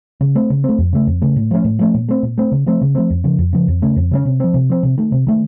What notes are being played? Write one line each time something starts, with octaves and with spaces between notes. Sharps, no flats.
C#3
A3 C4
C#3
A3 C4
F2
C#3 A3
F2
C#3 A3
A2
F3 A3 C#4
A2
F3 A3 C#4
A#2
A3 C4
A#2
A3 C4
C#3
F3 A3 C4
C#3
F3 A3 C4
F2
C#3 F3
F2
C#3 F3
F2
C#3 A3 C#4
F2
C#3 A3 C#4
C3
F3 C4
C3
F3 C4
C3
D#3 A3
C3
D#3 A3